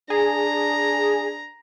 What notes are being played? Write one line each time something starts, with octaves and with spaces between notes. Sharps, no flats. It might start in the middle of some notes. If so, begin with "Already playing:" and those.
D4 G#4 A#5